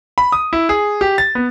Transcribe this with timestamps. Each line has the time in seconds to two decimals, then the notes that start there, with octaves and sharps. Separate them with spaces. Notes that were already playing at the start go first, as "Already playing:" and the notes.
0.18 B5
0.32 D#6
0.53 E4
0.69 G#4
1.01 G4
1.18 A6
1.35 B3